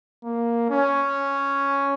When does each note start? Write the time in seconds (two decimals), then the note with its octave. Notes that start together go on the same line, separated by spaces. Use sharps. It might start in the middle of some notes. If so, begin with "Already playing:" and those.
0.24 A#3
0.70 C#4